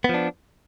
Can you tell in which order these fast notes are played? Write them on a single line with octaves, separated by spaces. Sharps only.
B3 F3 D4